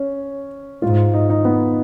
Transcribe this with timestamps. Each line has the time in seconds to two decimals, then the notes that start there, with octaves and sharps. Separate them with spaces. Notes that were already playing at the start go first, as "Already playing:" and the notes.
Already playing: C#4
0.82 G#2 F4
1.14 D#4
1.30 D#4
1.45 B3